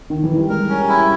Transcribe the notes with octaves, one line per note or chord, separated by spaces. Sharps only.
D#3
E3
G3
G#3 A#4
C#4
G3
E4